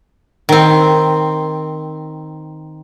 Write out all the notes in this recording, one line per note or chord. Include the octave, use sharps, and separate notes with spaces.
D#3 C4